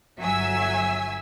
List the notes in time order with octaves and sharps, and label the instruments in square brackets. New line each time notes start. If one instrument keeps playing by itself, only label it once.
[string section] G1 F#3 E5 G#5 E6